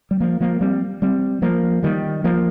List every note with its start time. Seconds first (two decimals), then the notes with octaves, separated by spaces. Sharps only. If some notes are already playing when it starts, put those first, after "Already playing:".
0.11 G3
0.20 F3 A#3
0.41 F3 A#3
0.61 G3 C4
1.02 G3 C4
1.42 F3 A#3
1.83 D#3 G3
2.24 F3 A#3